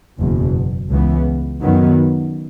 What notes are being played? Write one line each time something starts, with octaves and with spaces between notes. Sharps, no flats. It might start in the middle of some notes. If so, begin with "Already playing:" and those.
F#1 E2 B2
C#2 C#3 E3 B3
F#2 D#3 F#3 B3